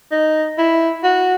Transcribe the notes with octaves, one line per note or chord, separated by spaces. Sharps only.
D#4
E4
F#4